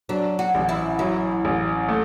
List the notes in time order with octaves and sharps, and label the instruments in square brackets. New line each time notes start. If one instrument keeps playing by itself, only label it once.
[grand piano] F#3 [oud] D4
[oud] F#4
[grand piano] A1
[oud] E4
[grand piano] F#3 [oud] E4
[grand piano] A1
A3